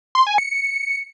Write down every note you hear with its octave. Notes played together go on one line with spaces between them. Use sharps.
C6
G#5
C#7